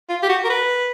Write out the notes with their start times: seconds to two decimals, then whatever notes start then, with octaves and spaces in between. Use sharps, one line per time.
0.09 F4
0.22 G4
0.29 F#4
0.44 A#4
0.50 B4